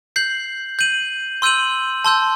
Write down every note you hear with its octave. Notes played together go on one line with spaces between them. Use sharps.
G6 C7 F#7
G6 D#7 F#7
C6 E6 G6 D#7 F#7
A5 C6 E6 G6